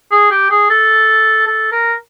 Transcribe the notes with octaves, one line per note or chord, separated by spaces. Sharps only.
G#4
G4
G#4
A4
A4
A#4